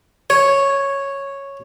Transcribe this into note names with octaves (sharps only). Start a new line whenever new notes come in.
C#5